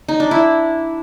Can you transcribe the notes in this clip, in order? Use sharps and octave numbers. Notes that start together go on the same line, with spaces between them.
D#4
D4
E4